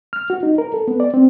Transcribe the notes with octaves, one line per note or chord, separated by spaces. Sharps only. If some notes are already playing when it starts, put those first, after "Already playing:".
F6
F#4
D#4
A#4
A4
B3
D5
C4